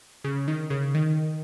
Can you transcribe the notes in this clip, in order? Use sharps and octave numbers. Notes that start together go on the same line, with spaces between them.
C#3
D#3
C#3
D#3